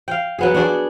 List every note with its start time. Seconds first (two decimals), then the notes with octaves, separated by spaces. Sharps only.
0.08 F5 G5
0.39 F#3 B3 G#4
0.54 D4 F#4 G#4 D5